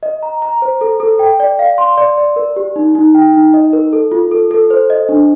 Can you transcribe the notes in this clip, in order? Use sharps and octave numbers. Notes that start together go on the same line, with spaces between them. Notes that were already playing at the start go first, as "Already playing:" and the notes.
D#5
A#5
A#5
C5
A4
A4
G5
D5
F5
C6
D5
D5
A#4
G4
D#4
D#4
G5
D#4
D#5
A#4
A4
F4
A4
A4
C5
D#5
D4